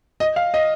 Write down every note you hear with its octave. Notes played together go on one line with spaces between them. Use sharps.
D#5
F5
D#5